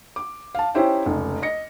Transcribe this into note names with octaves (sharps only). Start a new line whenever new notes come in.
D6
F5 A5
C#4 D#4 E4 G4 C5 G5
F1 C#2
D#5 A#6 C#7